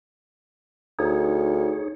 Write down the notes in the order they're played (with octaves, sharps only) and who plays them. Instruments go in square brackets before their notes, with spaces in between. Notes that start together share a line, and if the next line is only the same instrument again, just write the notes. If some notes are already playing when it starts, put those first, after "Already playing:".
[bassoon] D2 [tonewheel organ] D#4 G#4 C#5